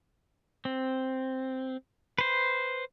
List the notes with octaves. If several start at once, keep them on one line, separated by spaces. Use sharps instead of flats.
C4
B4 C5